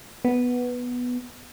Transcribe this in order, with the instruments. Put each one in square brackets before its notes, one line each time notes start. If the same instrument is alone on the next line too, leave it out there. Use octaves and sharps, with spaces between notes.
[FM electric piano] B3